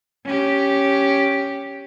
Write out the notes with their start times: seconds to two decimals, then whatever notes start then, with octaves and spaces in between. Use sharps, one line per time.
0.25 C#4 G4